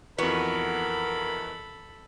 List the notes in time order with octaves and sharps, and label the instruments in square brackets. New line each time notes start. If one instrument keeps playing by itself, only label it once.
[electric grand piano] F2 E3 [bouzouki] B3 F#4 [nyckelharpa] A4 B5 [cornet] A#4